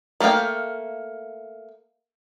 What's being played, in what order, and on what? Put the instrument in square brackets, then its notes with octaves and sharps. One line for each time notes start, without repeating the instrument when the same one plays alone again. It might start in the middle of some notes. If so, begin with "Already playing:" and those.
[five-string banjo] A3 A#3 D4 F5 G5